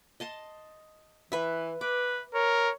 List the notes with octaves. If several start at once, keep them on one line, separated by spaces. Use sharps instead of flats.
D#5 A5 C6
E3 B4 E5
B4 D6
A#4 C#5